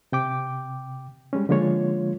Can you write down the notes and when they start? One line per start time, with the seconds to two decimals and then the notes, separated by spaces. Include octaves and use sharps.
0.12 C3 G5 D6
1.33 G3 G#3 C#4
1.49 D3 F3 G#3 A#3 F4 C#5